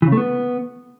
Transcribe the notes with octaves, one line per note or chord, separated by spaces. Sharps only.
E3
C#3
A3
B3